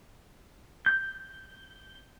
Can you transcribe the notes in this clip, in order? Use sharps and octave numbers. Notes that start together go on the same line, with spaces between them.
G6